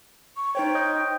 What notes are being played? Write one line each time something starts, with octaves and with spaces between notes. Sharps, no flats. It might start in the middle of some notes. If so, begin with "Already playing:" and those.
C#6
D#4 C5 C#5 G5
D#5 D#6 G6